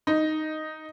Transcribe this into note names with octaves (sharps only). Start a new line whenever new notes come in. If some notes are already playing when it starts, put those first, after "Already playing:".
D#4